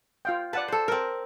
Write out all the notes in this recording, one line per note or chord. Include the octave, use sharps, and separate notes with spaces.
F4 F5 G5
B4 D5 F#5 A5
A4 C5
C4 A#4